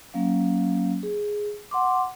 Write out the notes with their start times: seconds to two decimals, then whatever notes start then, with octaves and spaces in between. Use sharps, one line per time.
0.14 F#3 A#3 C#4 F5
1.03 G#4
1.71 F#5 C6 D6